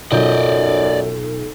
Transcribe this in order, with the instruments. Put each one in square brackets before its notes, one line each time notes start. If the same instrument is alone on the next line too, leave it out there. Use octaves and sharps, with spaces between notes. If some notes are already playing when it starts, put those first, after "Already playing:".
[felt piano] B1 F4 G6 [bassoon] F#2 [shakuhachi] A4 [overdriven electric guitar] D5 D#5